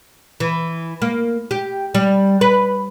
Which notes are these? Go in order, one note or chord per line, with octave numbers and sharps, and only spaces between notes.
E3
A#3
G4
G3
B4